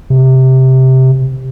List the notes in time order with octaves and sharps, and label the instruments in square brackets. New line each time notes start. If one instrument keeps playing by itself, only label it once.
[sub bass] C3